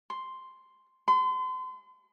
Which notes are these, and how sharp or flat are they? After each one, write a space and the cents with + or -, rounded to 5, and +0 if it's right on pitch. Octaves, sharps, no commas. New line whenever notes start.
C6 +0
C6 -40